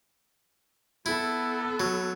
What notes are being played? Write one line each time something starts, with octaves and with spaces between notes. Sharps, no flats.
B3 E4 A4
F#3